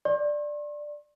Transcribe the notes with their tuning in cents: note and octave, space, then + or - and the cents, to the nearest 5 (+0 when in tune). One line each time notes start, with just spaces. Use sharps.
D5 +5 C6 +45